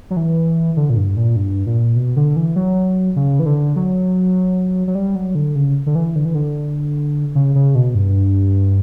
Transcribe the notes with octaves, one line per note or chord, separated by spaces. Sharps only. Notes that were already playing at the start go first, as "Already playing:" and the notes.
F#3
E3
D3
A#2
G2
A#2
G2
A#2
B2
D3
E3
F#3
C#3
E3
D3
F#3
F#3
G3
F#3
D3
C#3
D3
E3
D3
E3
D3
C#3
C#3
B2
G2